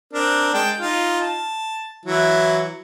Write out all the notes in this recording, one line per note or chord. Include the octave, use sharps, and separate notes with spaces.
C4 D4 A#4
G#3 G5 A5
D#4 F4
A5
E3 F#3 E4